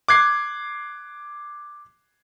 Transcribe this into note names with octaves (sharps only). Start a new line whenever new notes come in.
D6 F#6 G#6 C7